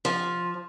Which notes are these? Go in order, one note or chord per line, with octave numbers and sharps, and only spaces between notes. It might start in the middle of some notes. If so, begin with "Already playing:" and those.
F3